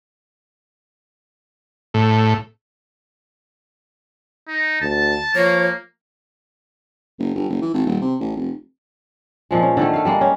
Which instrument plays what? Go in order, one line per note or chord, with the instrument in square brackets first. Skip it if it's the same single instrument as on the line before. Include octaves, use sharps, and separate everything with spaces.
[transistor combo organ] A2
[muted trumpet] D#4
[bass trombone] D2 [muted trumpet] A5
[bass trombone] F3 [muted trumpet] A#3 [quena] C#5
[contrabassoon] F#1
G1
F#1
E3
G#1
D#1
C3
A1
F1
[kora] A#2 F3 G#3
C#4
D3 D#3 A3
A3 F5
G3 G#3 A#3
C#4